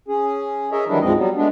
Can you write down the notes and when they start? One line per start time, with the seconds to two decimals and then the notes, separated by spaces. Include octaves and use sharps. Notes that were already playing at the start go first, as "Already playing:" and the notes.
0.08 C#4 G#4
0.72 G#4 A#4 C#5 D#5 E5
0.88 D#3 E3 F#3 G3 D4 E4
1.01 D2 G#2 F3 G#3 C4 D#5
1.17 F#3 G3 B3
1.36 G#3 A3 B3 D4